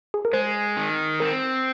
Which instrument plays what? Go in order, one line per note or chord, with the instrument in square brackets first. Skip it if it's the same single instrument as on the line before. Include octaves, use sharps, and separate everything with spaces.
[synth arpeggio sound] G#4
A#4
[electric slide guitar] G#3 [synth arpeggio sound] C5
[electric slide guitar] D#3
[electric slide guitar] C4 [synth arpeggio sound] A#4